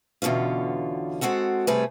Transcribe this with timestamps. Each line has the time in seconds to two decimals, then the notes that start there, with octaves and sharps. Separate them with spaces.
0.22 E2 B2 D3 C#4 F4
1.21 G#3 C4 F#4 A4 F#5
1.67 C3 G3 A3 G#4 B4